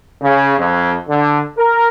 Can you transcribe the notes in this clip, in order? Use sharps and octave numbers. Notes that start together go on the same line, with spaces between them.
C#3
F2
D3
A#4